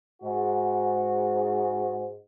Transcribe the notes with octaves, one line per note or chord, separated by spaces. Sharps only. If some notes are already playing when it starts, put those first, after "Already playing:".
G#2 F#4